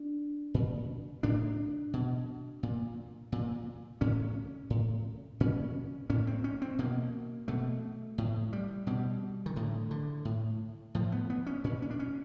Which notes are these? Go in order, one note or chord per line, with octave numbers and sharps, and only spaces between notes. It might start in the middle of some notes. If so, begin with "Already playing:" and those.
Already playing: D4
A#2
A2 D4
B2
A#2
A#2
A2 C#4
A2
A#2 C#4
A2 C#4
C4
C#4
C4
B2 A#3
B2 A3
A2
G3
B2 G3
D#3
A2 D3
D3
A2
A2 F3
B3
B3
C#4
A#2 C#4
C#4
D4
C#4